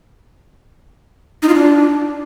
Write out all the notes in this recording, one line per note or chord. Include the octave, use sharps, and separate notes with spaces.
D#4
F4
D4